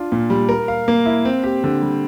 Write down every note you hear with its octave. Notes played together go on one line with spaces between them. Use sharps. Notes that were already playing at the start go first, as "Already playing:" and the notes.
Already playing: D4 F4
A#2
G3
A#4
F5
A#3
E4
C4
G4
D3
G3